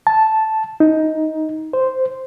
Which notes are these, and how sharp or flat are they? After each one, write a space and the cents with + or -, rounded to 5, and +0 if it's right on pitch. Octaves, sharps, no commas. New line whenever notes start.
A5 -5
D#4 +15
C5 -5